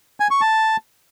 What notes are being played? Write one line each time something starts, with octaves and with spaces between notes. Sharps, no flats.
G#5
C#6
A5